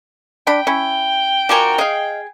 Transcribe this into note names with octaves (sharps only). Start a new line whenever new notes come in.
D4 G5 B5
C#4 E4
F3 D4 F#4 A#4 G#5
G#4 D#5 F5